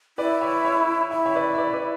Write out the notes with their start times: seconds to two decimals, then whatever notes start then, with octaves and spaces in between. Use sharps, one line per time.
0.18 E4 B4 D5
0.41 C#5 E5
0.65 C#5 E5
1.11 E4 E5
1.26 C#5 E5
1.35 B4 D5
1.54 E5
1.58 B4 D5
1.73 B4 D5